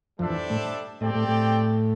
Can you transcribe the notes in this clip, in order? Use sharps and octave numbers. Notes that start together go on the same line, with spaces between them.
F2 F3 G3 D4 A4 C5 E5
E2 E3
A2 A3
A2 A3 C4 G4 D5 G5
A2 A3
A2 A3